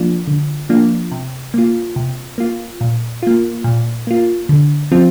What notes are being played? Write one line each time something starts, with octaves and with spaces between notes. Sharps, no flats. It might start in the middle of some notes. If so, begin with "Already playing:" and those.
Already playing: F3 A#3 D4 F4
D3
F3 A#3 D4 F4
C3
A#3 F4
C3
A#3 F4
A#2
A#3 F4
A#2
A#3 F4
D3
F3 C4 F4